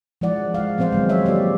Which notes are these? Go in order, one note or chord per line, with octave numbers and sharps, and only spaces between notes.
F3 G#3 E4 D5 F#5
G#3 F5
F3 B3 C4 C5 F5
D#3 F#3 G#3
C#5 E5
A#3 G4 A4 D5